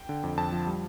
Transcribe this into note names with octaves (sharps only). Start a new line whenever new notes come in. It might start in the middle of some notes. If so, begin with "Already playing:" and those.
Already playing: G5
D3
F2
F2 A5
F3
G3